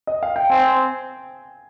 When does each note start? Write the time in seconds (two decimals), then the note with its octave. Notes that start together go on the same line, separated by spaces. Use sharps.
0.07 D#5
0.23 F5
0.36 G5
0.50 C4 G#5